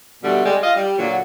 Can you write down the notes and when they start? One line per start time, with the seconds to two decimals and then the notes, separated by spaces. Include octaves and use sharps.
0.24 B2 D3 G3 A3
0.45 G3 G#3
0.63 F4 D#5 F5
0.76 G3
0.98 A#2 D3 F#3